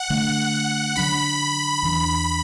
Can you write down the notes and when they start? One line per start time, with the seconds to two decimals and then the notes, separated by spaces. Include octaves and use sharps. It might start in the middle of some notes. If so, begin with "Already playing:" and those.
Already playing: F#5
0.10 D3 A3 D4
0.96 D3 F#3 D4 B5
1.83 E2 E3 D4